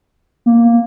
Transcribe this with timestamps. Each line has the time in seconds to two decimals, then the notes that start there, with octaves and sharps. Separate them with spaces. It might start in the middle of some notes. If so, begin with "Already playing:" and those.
0.46 A#3